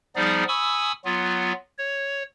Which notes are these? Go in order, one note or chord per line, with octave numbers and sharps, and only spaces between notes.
F3 G3 B3 D#4 G#4 D5
G#5 B5 C#6 D#6 E6
F#3 B3 F4
C#5